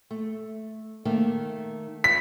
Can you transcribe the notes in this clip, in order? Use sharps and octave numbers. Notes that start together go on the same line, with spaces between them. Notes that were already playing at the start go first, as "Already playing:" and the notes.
A3
D#3 A3 A#3
B6